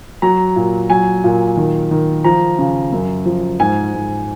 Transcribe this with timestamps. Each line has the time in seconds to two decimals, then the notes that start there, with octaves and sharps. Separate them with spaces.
0.22 F#3 A#5
0.56 A#2
0.90 F#3 G#5
1.24 A#2
1.57 D#3
1.91 D#3
2.24 F3 A#5
2.59 C#3
2.92 F#2
3.25 F3
3.59 G#2 G#5
3.94 G#2